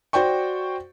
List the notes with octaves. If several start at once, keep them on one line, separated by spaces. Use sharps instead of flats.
F#4 C5 D5 G5 C#6